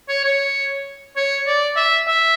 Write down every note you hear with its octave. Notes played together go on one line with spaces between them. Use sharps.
C#5
C#5
C#5
D5
E5
E5